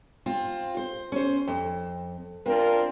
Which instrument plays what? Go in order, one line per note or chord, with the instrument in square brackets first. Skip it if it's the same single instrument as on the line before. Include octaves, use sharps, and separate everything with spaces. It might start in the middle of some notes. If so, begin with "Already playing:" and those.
[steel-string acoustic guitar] C4 F4
C5
C#4 C5
F2
[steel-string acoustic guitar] C4 [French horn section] D4 F4 A#4